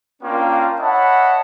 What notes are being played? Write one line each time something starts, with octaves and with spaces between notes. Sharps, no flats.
A#3 C#4 D4 F4 G5
C#5 D#5 E5 F#5 A5 B5